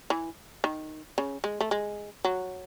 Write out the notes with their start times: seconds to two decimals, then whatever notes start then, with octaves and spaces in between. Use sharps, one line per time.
0.10 E3
0.64 D#3
1.18 C#3
1.44 G#3
1.61 A3
1.71 G#3
2.25 F#3